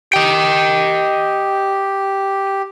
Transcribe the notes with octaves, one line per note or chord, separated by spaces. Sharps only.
G4 D#5 G5